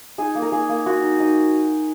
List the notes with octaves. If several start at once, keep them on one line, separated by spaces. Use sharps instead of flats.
D#4 G#4
A#3
A#4
A#3 G#4
A#3
A#3 F#4
D#4
D#4